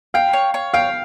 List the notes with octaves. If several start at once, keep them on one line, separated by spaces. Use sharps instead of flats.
F5 G5
C#5
C#5
F5 G5